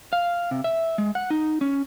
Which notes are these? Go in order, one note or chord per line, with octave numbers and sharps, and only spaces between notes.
F5
C3
E5
G#3
F#5
D#4
C#4